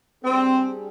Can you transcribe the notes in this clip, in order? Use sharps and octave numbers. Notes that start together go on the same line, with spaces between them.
G3 C4 D4 G#4